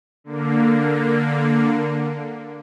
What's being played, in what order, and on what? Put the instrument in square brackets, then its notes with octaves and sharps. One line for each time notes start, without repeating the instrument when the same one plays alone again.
[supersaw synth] D3 A#3